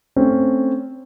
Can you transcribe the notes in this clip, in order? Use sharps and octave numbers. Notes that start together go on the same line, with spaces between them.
A3 C4 C#4